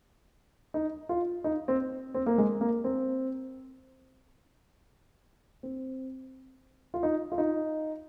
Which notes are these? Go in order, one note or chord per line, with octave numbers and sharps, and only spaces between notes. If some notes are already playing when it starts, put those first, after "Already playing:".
D#4
F4
D#4
C4
C4
A#3
G#3
A#3
C4
C4
F4
D#4
F4
D#4